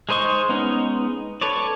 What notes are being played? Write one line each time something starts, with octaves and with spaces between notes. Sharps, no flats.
G#3 D#4 C5 D#5 C#6
G#3 B3 C#4 D#4
A4 B4 C#5 D5